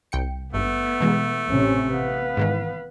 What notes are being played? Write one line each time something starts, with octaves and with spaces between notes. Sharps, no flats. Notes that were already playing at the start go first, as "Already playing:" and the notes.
C2 G5 C#7
G#1 G2 A3 B3
B2 E3 G#3
A1 C3 C#4
B3 B4 F5
G#2 D#3 E3